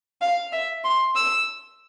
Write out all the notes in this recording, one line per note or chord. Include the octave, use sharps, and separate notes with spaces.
F5
E5
C6
E6